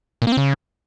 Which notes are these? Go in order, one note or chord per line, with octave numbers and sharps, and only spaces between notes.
A#2
A#3
C4
C#3